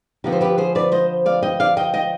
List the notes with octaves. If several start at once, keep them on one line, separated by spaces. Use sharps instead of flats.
D3 F3 B3 D#4 G4
C5
G4 B4
G#4 C5
B4 D5
C5 D#5
D5 F5
D#5 G5
D5 F5
D#5 G5
D#5 G5